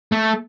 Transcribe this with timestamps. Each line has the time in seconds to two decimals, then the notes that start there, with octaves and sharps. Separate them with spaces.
0.12 A3